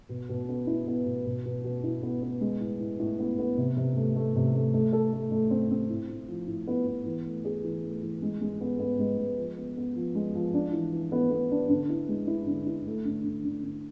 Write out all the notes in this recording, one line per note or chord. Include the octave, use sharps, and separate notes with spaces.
B2
B2
B3
E4
B3
B2
B2
B2
B2
E4
B3
B3
G#3
A2
A2
A2
B3
B3
C3
C3
A3
A3
C3
A3
A3
A4
A3
A3
C4
C4
A2
A2
F3
A2
B3
B3
E3
A3
G#4
E3
A3
E3
G#3
G#3
B3
B3
G#3
G#3
F3
B3
B3
F3
G#3
F3
D4
E3
E3
B3
B3
D4
D3
E4
G#3
E4
D3
E4
A3
D3
D3
D3
D3